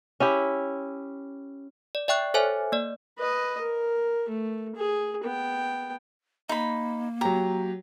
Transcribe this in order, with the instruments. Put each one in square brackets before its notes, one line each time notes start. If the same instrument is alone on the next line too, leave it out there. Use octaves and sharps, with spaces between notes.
[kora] C#4 E4 G4
[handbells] D5
D5 E5 G5 C#6 F#6
A4 C5 C#5 E5 G#5
A#3 D5
[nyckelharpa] B4 D#5
A#4
A3
G#4
B3 G5
[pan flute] A#3 [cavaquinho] D#4 B5
[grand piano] F#3 G4 [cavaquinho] A#5